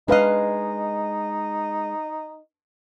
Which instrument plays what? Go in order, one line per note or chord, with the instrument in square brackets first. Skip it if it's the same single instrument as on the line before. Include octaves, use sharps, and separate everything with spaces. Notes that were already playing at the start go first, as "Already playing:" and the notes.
[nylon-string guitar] G#3 D#5 [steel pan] D4 B4 F5 [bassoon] D#4